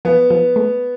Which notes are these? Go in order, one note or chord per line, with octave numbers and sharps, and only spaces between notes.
F3 B3
F3
A3